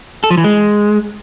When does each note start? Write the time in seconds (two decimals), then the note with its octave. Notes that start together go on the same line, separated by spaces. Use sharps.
0.24 A4
0.31 F3
0.37 E3
0.44 G#3